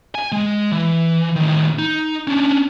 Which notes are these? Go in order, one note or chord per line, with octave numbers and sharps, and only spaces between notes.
G#5
G#3
E3
A2 D#3
D#4
C#4 D4